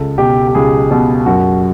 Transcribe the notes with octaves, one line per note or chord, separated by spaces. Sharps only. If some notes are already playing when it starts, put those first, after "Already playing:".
Already playing: C#2 A4
B2 G4
G4
C#2 G#4
B2
F#2 F#4